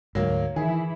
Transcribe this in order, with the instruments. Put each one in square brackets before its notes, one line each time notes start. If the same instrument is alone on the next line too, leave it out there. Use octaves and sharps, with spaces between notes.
[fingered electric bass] D2 G#2 [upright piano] F#3 A#3
[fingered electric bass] D#3 [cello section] E3 E4 [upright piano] G#4